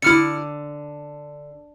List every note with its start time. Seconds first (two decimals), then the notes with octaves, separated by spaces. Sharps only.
0.02 D3 E4 F6 C#7